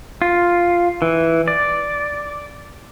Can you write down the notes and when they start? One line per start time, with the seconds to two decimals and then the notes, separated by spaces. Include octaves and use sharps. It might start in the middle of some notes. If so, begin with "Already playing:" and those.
0.22 F4
1.02 E3
1.48 D5